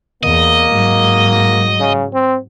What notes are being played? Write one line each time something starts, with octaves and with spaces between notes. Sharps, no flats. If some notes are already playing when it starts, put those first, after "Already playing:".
E2 A#3 D#5
G#2 F#3
C#3
C4